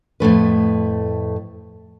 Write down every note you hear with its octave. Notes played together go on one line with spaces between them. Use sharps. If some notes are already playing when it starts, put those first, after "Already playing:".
F2 A2 A3 B4